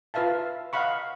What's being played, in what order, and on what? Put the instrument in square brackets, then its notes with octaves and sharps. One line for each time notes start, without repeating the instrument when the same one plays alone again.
[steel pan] F4 B4 E5 F5 A5
D#5 F5 F#5 B5 C#6